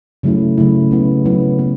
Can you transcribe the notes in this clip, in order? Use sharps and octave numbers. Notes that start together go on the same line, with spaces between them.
C#3 F#3 A3 E4
C#3 F#3 A3 E4
C#3 F#3 B3 E4
C#3 F#3 B3 E4
B3